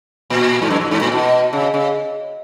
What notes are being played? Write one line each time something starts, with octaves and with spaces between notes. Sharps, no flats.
A#2
G#2
F#2
F#2
G#2
A#2
B2
C#3
C#3